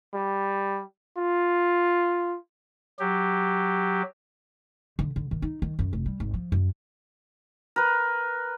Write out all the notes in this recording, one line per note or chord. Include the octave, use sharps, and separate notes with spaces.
G3
F4
F#3 G4
D3
D3
D#3
D#4
D#3
F#2
F1
G3
G#1
F3
F#2
A#4 B4